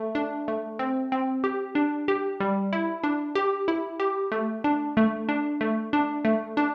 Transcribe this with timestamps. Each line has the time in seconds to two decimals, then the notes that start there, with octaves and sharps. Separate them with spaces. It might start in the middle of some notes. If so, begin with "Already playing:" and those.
Already playing: A3
0.15 D4
0.48 A3
0.79 C4
1.12 C4
1.44 G4
1.75 D4
2.08 G4
2.40 G3
2.73 E4
3.04 D4
3.35 G4
3.68 E4
4.00 G4
4.32 A3
4.64 D4
4.97 A3
5.29 D4
5.61 A3
5.93 D4
6.25 A3
6.57 D4